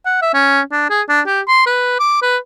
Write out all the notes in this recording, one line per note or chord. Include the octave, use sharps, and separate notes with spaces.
F#5
E5
C#4
D4
G#4
D4
G4
C6
B4
D6
B4